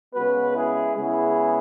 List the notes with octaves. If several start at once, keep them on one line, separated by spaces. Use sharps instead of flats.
C#3 G#3 B3 F#4 B4
E4 G#4
C#3 G#3 B3 E4 G#4